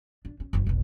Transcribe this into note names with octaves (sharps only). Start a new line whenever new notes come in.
D4
C#4
F#1 F#2
F1 B1